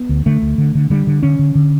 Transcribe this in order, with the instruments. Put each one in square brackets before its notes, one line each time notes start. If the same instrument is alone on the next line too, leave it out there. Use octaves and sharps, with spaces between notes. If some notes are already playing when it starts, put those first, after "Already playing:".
Already playing: [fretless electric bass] B3
D2
D3 A3
D2
D3
D3
D3 G3
D3
D3 C#4
D3
D3